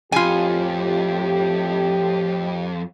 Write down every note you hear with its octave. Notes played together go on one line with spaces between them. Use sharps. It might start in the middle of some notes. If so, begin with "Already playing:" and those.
F2 A2 F4 G4 G#5